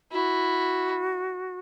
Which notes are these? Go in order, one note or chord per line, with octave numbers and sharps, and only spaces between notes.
E4 F#4